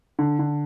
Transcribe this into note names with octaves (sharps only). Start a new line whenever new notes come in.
D3
D3